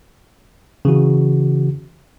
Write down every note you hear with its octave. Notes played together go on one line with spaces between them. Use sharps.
C#3 E3 F#4